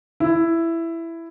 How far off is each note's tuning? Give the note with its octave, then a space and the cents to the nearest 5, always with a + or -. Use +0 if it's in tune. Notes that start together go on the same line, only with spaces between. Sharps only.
E4 +10